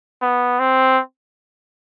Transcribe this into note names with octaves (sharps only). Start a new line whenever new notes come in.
B3
C4